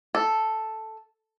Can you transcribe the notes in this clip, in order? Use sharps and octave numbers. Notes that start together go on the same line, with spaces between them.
A4